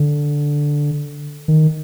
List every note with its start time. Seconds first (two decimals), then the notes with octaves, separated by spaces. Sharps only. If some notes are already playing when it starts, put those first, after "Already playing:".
Already playing: D3
1.48 D#3